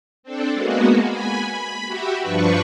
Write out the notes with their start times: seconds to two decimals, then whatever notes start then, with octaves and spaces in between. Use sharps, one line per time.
0.23 C4 D4 A4
0.53 G#3 A#3 B3 F#4
1.06 G#5 B5
1.49 B5
1.86 F#4 G4 E5
2.21 G2 F3 D4 B4 C#6